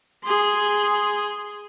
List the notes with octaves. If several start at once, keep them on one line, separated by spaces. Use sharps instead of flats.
G#4 C6